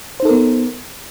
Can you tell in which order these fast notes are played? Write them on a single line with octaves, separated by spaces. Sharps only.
C5 D#4 A4 A#4 B3